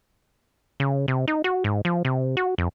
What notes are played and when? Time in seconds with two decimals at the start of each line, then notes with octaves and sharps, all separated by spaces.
0.80 C#3
1.08 C3
1.28 D#4
1.44 F#4
1.64 G#2
1.85 F3
2.05 C3
2.37 F#4
2.58 F2